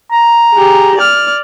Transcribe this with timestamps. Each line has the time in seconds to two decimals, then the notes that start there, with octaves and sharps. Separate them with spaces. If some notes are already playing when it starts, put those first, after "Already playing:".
0.11 A#5
0.53 G4 G#4
0.98 D5 F6